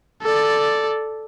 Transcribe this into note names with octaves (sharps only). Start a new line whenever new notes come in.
A4 D5